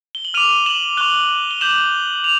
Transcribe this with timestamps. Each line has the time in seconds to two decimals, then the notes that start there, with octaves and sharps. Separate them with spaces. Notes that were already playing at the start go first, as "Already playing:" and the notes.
0.15 G7
0.25 F#7
0.34 D6 F6 D#7 F7
0.66 E7 F#7
0.97 C#6 F#6 F7 G7
1.51 G7
1.61 D6 G6 E7 F#7
2.24 F7